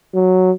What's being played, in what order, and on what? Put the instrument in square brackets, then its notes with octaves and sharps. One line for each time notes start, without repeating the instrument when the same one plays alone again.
[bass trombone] F#3